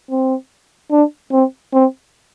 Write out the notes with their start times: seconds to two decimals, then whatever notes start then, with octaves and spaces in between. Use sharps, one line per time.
0.10 C4
0.91 D4
1.31 C4
1.73 C4